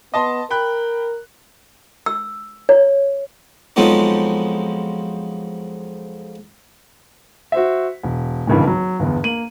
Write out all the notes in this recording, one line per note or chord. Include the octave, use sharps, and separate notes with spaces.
B3 D#5 A5 C6
A#4 G5 B5 F#6
E6
C#5
F2 F3 F#3 G#3 B3 D#4
F#4 C5 E5
E1
D#1 G#1 C#2 G2 E3
F#3
G1 E2
A#3 D#7 F#7